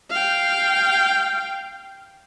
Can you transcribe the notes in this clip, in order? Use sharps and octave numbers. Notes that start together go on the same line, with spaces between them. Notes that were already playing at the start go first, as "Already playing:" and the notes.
F5 G5